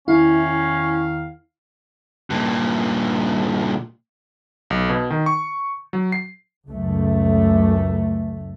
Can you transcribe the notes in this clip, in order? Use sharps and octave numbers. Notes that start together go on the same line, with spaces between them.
E2 D#3 C#4 E4 F5
G2 A#2
B1
B2
D#3
C#6
F#3
C7
C#2 F#2 A3